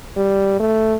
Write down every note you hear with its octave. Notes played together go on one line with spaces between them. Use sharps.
G3
A3